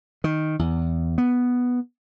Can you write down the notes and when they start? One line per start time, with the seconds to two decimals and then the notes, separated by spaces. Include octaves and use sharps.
0.24 D#3
0.59 E2
1.18 B3